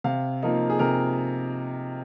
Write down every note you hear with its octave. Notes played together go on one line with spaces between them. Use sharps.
C3 F5
F3 A#3 D#4
G#4
C3 A#4